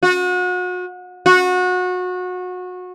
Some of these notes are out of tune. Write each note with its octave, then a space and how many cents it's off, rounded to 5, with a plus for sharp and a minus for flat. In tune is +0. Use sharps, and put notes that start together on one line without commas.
F#4 -35
F#4 -25